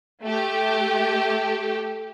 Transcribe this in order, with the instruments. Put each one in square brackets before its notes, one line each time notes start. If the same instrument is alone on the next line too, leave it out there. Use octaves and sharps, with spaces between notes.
[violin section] A3 G4